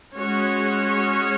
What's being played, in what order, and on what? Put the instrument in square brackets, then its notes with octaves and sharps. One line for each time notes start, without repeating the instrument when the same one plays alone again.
[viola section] G#3 C#4 F#4 C#5